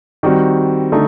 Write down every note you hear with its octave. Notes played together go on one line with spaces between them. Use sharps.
D#3 G3 C4 F#4
D3 A3 D#4